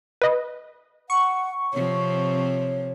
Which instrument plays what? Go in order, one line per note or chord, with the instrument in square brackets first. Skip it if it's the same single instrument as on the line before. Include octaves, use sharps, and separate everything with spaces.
[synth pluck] B4 D#5
[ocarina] F#5 [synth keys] C#6
[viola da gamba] C3 F3 C4 [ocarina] C#5